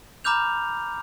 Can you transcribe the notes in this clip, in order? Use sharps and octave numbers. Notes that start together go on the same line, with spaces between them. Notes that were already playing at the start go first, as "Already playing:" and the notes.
A#5 B5 D6 F6 G6 F7